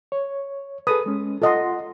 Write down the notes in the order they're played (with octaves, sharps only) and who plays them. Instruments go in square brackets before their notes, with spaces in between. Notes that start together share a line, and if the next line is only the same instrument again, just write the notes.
[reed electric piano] C#5
[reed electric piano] G#4 A4 B4 [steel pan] D#6
[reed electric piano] G#3 C#4
[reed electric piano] F4 F#5 C6 [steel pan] A4 D#5